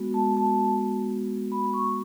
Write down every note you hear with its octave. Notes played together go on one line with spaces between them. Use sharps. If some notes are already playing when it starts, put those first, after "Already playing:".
Already playing: G#3 B3 F#4
A5
A5
B5
C#6